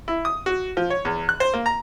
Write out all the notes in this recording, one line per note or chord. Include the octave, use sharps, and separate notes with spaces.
E4
D#6
F#4
F3
C#5
E2
F#6
C5
A#3
A#5